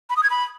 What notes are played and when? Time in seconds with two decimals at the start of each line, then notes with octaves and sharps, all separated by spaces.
0.10 B5
0.16 D#6
0.23 G#6
0.30 B5